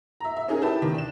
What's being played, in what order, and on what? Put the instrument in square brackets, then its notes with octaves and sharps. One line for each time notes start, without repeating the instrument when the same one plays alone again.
[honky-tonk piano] E5 A#5
E5
C#4 D#4 G#4 A#4
E4 G4 B4 A5
D#3
D4 E7